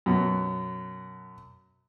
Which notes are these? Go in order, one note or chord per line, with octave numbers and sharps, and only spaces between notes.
F#2 B2